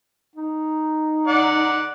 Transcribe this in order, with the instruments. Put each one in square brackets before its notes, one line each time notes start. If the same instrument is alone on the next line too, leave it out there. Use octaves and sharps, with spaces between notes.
[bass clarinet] D#4
[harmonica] D5 F#5